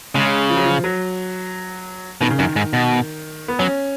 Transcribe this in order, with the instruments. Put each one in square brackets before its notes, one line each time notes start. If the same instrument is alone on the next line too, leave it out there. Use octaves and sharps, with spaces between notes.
[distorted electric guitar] C#3 [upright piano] G#3
[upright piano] F3
F#3
F3
F#3
[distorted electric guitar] B2 [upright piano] D#3
[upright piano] C#3
[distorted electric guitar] F#2 [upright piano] D#3
[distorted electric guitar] G#2
B2
[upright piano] B3
[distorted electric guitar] F#3 [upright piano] C#4